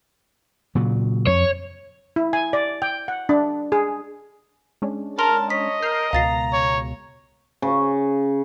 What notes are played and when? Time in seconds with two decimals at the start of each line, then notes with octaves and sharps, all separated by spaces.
0.75 A#2 C#3 F#3
1.27 F2 C#5
2.16 E4
2.33 G#5
2.53 D5
2.82 G5
3.08 F#5
3.29 D4
3.72 G#4
4.82 G#3 C#4 D4
5.19 A#4 A5 A#5 C6 F6
5.50 C#5 D#5 B6
5.82 A#4 F6 G6 C7
6.13 C#2 B2 F5 A#5 A6 C7
6.53 C#5
7.62 C#3